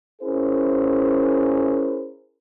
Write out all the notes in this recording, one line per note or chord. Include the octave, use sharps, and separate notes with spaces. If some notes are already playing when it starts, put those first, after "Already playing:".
C#4 E4 G#4 A#4 C5